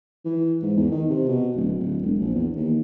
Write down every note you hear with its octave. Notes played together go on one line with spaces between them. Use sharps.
E3
G#2
E2
D#3
C3
B2
D1
D1
E1
A#1
E2
D#2